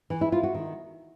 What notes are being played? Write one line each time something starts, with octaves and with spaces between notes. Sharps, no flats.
E3
E4
F4
F#4
D#3